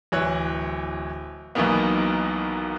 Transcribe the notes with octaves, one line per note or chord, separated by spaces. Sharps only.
D1 E3 C#5 F#6
B1 B2 D#3 E3 A#3 B3